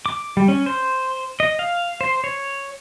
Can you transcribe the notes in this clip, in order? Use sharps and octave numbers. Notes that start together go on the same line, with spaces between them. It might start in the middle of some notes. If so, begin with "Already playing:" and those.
D6
G3
C#4
C5
D#5
F5
C5
C#5